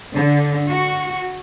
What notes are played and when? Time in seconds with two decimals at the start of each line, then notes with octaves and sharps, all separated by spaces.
0.15 D3
0.71 F#4